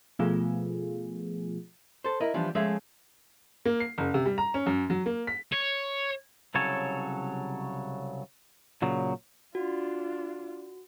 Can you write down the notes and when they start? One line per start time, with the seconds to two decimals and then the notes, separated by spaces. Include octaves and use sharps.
0.19 B2 F3 A3 B3 F4 G#4
2.04 A4 C5
2.21 E4 A#4 D#5
2.34 E3 F3 G3 B3 D4
2.55 F3 G#3 A3 C#4 G#4 E5
3.65 A#3
3.80 C7
3.98 F#1
4.14 C3
4.26 G3
4.38 A#5
4.54 C#4
4.66 F#2
4.90 F#3
5.06 A#3
5.27 B6
5.52 C#5
6.55 C2 C#3 F#3 A4 C#5
8.82 A#2 C#3 F#3
9.55 D4 F4 F#4